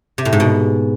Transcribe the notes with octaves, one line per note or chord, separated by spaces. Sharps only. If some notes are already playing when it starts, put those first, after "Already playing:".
C3
A2
G#2
B2